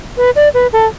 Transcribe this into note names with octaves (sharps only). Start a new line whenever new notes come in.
B4
D5
B4
A4